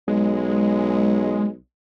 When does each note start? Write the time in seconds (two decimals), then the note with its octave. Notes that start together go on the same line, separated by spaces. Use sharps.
0.08 B1 G#3